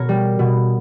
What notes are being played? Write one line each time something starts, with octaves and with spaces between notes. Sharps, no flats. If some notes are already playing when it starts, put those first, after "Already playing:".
Already playing: B2 A#4 C#5
G3
B2